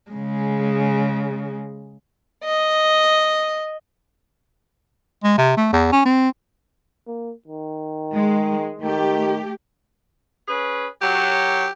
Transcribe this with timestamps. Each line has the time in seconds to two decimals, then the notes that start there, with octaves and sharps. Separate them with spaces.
0.11 C#3 G#3
2.44 D#5
5.24 G#3
5.38 C3
5.57 A3
5.73 E2
5.92 C#4
6.05 C4
7.07 A#3
7.47 D#3
8.12 G#3
8.81 D#3 A3 G4
10.48 C#4 G#4 B4
11.02 F#2 F#3 G4